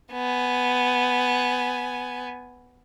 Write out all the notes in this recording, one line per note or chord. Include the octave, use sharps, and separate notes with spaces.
B3 G#5